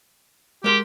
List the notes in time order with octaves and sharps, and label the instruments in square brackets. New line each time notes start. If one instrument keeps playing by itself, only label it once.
[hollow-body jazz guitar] G#3 A#4 C6 [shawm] G4